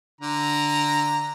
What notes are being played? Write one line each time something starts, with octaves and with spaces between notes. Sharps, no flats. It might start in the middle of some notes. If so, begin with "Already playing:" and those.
D3 A#5